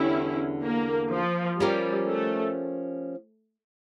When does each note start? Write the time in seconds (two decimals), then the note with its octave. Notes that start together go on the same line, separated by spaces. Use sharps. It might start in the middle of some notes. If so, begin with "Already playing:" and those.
Already playing: E2 D3 G3 C#4 D4 E4 G4
0.63 A#3
1.12 F3
1.60 F3 G3 C#4 G4 A#4 D5
2.08 A3